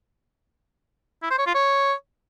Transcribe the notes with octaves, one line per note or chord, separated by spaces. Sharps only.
E4
C5
C#5
F4
C#5